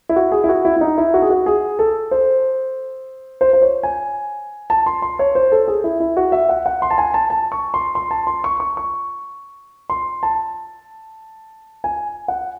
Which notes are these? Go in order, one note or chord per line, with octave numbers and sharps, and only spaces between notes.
E4
F#4
G#4
E4
F#4
E4
E4
D#4
E4
F#4
G#4
F#4
G#4
A4
C5
C5
C5
C#5
G#5
A5
C6
C6
C#5
C5
A4
G#4
E4
E4
F#4
E5
F#5
F#5
C6
A5
G#5
A5
A5
C#6
C6
C6
A5
C6
C#6
C#6
C#6
C6
A5
G#5
F#5